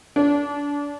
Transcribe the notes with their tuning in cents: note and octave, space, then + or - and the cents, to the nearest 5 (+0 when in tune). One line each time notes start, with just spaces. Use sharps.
D4 -30